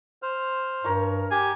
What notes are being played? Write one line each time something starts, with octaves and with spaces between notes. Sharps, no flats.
C5 F6
G2 A#4 C#5 A#5
G4 G#5